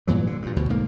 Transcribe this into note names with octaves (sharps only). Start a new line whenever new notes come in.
G2 A#2 E3 F#3
D3
G2 A#2
D2 B2
B1 G#2 A#3